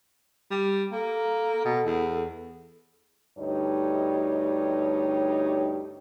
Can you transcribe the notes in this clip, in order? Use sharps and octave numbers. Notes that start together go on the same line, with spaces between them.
G3
A#3 A4
B2
E2
D2 G2 D#4 G4 C#5